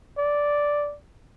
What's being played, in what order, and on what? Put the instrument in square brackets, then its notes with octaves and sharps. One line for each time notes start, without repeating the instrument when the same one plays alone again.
[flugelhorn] D5